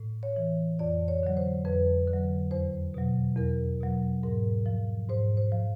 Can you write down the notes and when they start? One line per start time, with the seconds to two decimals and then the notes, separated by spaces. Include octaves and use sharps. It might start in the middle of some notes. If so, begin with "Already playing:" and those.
Already playing: A2
0.23 C#5
0.36 E3
0.79 F2 D5
1.08 C#5
1.23 D3 F#3
1.37 C5
1.65 F2 B4
2.08 D3
2.13 F#3
2.51 E2 C5
2.94 B2 F#3
3.37 E2 A#4
3.80 B2 F#3
4.23 G#2 A#4
4.66 F3
5.09 G#2 C5
5.37 C5
5.52 F3